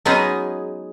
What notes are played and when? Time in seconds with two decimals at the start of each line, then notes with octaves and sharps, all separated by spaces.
0.05 F#3 G#3 B3 C#4 D#4 G#4